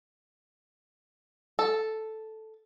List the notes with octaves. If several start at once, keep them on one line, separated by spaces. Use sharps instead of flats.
A4